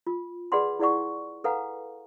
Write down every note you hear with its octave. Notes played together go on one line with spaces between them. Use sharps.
F4
G#4 B4 D5 F#5 B5 C6
E4 G#4 D5 F#5 C#6
A4 B4 F5 F#5 G#5 A#5